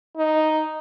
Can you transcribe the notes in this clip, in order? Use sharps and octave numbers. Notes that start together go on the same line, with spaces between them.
D#4